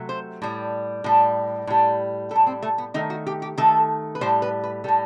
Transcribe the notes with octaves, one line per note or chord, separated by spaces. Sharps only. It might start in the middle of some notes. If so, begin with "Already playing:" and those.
Already playing: C3 F#3 A3
C5
A2 G3
A2 G3
A2 G3
A2 G3 A4
C4
A3
B3
D#3 A3 D#4
F#4
G4
G4
D#3 A3 A4
B4
A2 G3 C5
B4
B4
A2 G3 A4